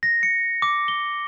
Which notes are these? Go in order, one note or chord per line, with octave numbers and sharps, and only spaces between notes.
A#6
C#7
D6
G7